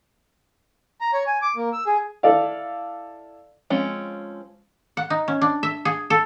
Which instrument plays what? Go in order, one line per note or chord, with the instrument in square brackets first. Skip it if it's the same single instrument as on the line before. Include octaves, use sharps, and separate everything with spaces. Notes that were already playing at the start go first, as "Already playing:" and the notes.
[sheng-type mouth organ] A#5
C#5
G#5
D6
A#3
E6
G#4
[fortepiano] E4 A4 D5 F5
[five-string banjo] F3 G#3 C4 C#4
[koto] F#5
D#4
C#4
D4
E5
G#4
A4